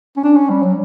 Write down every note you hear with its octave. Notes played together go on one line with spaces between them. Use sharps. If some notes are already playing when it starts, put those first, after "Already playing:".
C#4
D4
C#4
G3
F#3